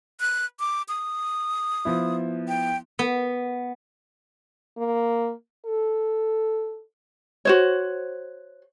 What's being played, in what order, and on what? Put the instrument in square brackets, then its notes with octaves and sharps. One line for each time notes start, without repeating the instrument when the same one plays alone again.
[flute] F#6
D6
D#6
[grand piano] F3 B3 E4
[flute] G5
[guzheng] B3
[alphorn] A#3
A4
[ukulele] F#4 C5 C#5